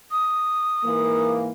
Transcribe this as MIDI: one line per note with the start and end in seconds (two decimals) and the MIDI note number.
0.12 1.32 87
0.84 1.51 44
0.84 1.51 52
0.84 1.51 58